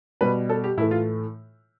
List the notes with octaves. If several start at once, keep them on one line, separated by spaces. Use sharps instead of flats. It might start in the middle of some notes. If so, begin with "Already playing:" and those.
B2 G3 B4
A4
G4
A2 E3 A3 E4
F4